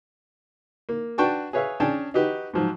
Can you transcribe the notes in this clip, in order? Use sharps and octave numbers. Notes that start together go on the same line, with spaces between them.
A#3
D4 F#4 B4 G5 A5 C#6
G#4 B4 C#5 E5 F5
C#4 D4 G#4 G5 A5
D#4 F#4 G4 B4
G#2 F3 F#3